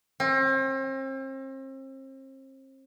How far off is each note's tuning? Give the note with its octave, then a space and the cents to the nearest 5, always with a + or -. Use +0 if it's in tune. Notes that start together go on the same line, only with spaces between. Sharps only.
C4 +40